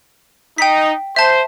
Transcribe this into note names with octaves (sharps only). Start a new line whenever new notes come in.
D#4 G5 B6
C5 E5 A5